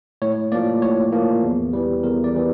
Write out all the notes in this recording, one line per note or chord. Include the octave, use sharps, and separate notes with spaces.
A2 C#5
F3 A#3 D5
A2 C#5
F3 A#3
E2
E3 G3
E2 A#4
D5
E3 G3